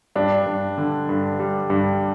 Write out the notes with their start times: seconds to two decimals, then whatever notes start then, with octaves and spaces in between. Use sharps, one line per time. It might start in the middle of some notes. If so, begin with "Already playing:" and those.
0.16 G2 D4
0.46 G2
0.78 D3
1.09 G2
1.39 G3
1.70 G2